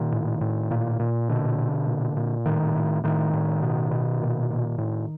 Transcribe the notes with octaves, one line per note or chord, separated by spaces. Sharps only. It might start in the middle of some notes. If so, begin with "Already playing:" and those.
Already playing: A#2 D#3
A2
A2
A#2
A#2
B2 D3
B2
A#2
A#2
A2 D#3
A2
A2 D#3
A2
B2
B2
A#2
A#2
A2